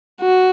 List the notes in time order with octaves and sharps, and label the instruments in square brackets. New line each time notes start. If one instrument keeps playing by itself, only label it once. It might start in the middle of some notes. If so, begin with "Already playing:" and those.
[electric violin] F#4